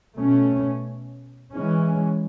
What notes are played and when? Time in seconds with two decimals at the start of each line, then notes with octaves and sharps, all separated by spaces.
0.17 B2 A3 C#4
1.54 E3 G#3 C#4